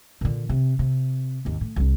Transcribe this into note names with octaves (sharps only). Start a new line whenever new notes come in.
A#2 D3
C3
C3
G#1 D#2
A2
C2 D4